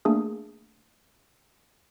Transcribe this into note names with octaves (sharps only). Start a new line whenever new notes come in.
A3 A#3 D4 G#4 D#6